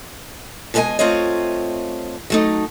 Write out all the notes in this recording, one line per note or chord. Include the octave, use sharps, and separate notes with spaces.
B2 G#3 A#4 B4 D#5 G#5
A3 C4 F4 C5 C#5 D#5
F#3 A3 D#4